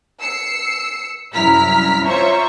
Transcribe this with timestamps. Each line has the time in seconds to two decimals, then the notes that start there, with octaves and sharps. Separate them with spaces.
0.20 E6 C7 C#7
1.34 C2 F#2 E4 A#5 F6 B6
2.06 F4 C5 C#5 E5 A#5 C#6